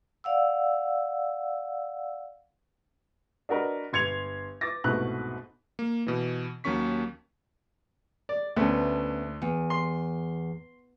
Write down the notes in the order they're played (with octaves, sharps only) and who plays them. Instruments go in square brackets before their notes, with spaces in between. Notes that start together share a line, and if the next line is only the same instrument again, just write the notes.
[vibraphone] D5 F5 F#5 E6
[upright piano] D4 F#4 A#4 B4 D#5
G1 C6 G#6 C#7 F7
D6 A6 A#6
C2 G#2 B2 A3 B4 F#6
[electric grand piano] A#3
B2 E3
D#2 F#3 A#3 C#4 C#6 B6
[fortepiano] D5
[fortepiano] D2 A3 [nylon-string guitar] B3 C#4
[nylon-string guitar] E2
[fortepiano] C6